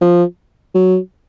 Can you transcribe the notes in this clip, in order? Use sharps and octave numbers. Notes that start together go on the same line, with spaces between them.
F3
F#3